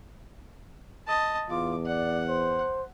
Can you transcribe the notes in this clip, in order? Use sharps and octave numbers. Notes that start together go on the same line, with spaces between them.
D#5 A5
E2 F4 D6
D5 F#5
C5